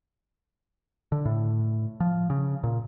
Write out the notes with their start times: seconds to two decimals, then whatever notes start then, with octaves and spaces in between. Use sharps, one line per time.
1.12 D3
1.25 A2
2.00 F3
2.30 C#3
2.64 A#2